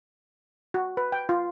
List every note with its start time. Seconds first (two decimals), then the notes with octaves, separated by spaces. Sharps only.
0.74 F#4
0.97 B4
1.12 G5
1.29 F4